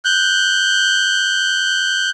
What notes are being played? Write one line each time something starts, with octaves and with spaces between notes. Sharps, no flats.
F#6 G6